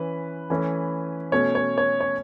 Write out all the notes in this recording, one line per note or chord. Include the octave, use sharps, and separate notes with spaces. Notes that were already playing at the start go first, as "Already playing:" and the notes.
Already playing: E3 C#4 B4
E3 A3 C#4
B2 A3 C#4 C#5
C#5
C#5
C#5